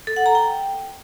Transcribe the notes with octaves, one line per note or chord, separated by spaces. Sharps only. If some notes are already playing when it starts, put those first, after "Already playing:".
A4
F#5
A#5
G5